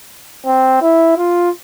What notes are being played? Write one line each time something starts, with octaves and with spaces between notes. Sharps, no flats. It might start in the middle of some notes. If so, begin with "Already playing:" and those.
C4
E4
F4